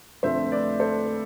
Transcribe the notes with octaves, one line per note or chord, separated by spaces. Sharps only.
F2 D3 A3 C4 C5 E5
B4 D5
A4 C5